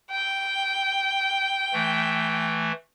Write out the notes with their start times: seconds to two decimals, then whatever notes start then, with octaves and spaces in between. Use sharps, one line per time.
0.11 G5
1.73 E3 A3